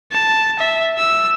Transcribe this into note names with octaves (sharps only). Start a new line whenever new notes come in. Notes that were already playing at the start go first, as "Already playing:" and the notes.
A5
E5
E6